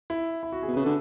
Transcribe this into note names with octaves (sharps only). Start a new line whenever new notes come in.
E4
E4
F#4
G#4
B2
B4
C#3
D3 A4